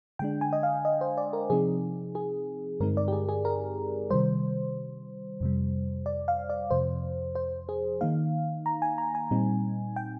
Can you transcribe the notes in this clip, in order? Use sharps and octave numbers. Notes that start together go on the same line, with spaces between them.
D3 G#3 D4 G5
G#5
D#5
F5
D#5
C5
D5
A#4
C3 F3 C4 D#4 G#4
G#4
G2 D3 G#3 C4 D#4 A#4
D5
G4
G#4
G#4
A#4
C3 D#3 G3 C5
F2 C3 G3
D5
F5
D5
F2 C3 F3 C5
C5
G#4
D#3 A#3 D#4 F5
A#5
G#5
A#5
G#5
A#2 G3 C4 D#4
G5